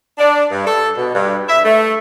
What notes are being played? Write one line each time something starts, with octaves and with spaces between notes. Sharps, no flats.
D4
G2
A4
B2
G2
E5
A3